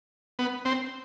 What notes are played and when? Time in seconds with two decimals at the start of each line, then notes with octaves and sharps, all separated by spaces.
0.39 B3
0.65 C4